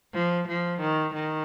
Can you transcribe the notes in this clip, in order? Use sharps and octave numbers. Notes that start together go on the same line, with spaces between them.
F3
F3
D#3
D#3